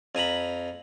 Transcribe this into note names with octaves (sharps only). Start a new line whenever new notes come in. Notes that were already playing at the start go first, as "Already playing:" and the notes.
F2 G#5 A#5 B5